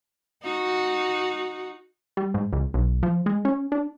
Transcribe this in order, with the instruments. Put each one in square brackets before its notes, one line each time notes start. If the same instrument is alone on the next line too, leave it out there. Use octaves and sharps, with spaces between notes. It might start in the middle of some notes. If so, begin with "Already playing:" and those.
[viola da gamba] D#4 F#4
[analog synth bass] G3
G#2
C#2
B1
F3
G#3
C#4
D4